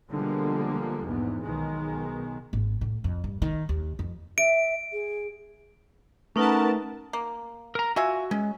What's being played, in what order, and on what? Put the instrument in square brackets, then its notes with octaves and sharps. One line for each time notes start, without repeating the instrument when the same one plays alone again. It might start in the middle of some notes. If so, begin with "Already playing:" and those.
[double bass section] B2 D3 F3 G3 G#3 A#3
A#1 E2 G#2 B3
B1 B2 D#3 G#3
[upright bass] G#1
A2
F2
G2
D#3
D#2
F2
[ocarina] E5 [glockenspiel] D7
[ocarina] G#4
[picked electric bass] A3 [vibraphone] C#4 D#4 F#5 [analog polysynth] A#4 B4 A5
[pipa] A#3
[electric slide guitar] A#4 A#5
[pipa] F4 E5 G#5 [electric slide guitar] F#4
[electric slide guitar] G#3 [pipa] C#4